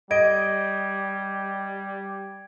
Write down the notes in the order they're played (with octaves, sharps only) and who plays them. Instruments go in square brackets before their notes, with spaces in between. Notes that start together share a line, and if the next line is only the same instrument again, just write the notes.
[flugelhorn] G3 [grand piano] D#5 [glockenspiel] G#6 D7